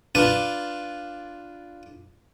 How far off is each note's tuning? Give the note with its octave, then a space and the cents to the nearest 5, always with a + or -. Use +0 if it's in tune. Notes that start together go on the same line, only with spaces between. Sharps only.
D4 +0 F4 +0 B4 +0